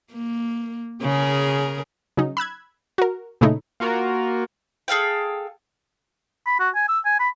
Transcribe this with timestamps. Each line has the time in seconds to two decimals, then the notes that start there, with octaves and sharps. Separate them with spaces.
0.12 A#3
1.02 C#3 G#4 A#4
2.17 C#3 F#3 C#4 D#4
2.37 B5 E6 F#6 G#6
2.98 F#4 A#4
3.41 A#2 C#3 A3 D#4 E4
3.80 A#3 F4 F#4 A#4
4.88 G#4 A4 F5 G5
6.46 B5
6.60 F#4
6.75 G#5
6.89 E6
7.05 G#5
7.20 B5